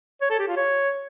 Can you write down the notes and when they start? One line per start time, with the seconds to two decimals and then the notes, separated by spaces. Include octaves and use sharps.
0.21 C#5
0.30 A4
0.39 G4
0.48 F4
0.57 C#5